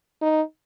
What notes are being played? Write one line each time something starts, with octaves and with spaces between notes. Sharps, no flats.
D#4